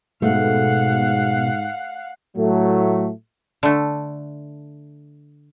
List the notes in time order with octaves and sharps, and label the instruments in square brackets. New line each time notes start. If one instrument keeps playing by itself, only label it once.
[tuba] G#2 [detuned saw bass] B2 [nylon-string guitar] A3 [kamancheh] F5 F#5
[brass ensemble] A2 F#3 A3
[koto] D3 A3